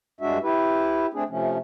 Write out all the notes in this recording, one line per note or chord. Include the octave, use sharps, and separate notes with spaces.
G2 G#3 D4 F#4 E5
E4 G4 B4
A3 C4 D4 G#4
C3 F3 A3 C#4